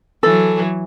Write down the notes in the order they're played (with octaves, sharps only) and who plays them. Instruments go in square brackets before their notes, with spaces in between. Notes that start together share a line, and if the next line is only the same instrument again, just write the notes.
[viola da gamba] E3 F#3 [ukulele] A4